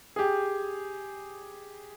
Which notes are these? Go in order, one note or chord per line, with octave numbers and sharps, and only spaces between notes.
G4 G#4